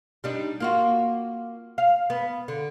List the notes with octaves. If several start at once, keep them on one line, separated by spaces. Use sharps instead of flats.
G3 D4 D#4
A#3 F4 F#4
F5
B3
D3